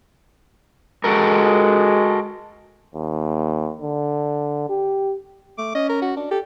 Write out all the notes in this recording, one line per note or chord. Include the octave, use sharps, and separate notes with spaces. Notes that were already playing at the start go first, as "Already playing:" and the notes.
G#3 F#4 A4 A#4
D#2
D3
G4
A3 D6
C#4 D#5
A#4
F#4
D4
G4 A4